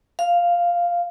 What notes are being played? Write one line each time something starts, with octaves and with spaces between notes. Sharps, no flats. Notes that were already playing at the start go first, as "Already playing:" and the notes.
F5